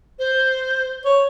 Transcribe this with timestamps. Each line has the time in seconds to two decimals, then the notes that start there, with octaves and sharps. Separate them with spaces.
0.18 C5
1.05 C#5